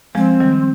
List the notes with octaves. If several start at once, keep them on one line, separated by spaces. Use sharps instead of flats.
F3 G#3 C4
D#3 G3